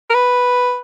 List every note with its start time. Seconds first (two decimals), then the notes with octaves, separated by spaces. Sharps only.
0.10 A#4
0.14 B4